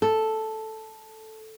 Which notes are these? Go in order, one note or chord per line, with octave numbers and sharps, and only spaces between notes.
A4